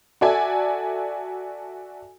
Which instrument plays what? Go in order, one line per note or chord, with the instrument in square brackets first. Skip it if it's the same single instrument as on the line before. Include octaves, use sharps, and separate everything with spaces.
[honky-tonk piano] F#4 A4 D5 E5 G#5